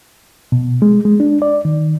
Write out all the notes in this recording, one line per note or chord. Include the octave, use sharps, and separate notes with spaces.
B2
G#3
G#3
D4
D5
D#3